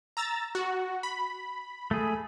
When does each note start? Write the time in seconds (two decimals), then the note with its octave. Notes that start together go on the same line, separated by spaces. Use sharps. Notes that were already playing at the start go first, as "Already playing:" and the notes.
0.17 A#5 E6 A6
0.55 F#4
1.03 B5
1.91 A3 G#4